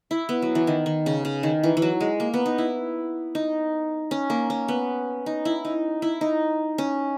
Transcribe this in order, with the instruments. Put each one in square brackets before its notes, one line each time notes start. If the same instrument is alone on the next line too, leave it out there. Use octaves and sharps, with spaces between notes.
[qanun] E4
B3
F#3
E3
D#3
D#3
C#3
C#3
D#3
E3
E3
F#3
G#3
A#3
B3
D#4
E4
D#4
C#4
A#3
C#4
B3
D#4
E4
D#4
E4
D#4
C#4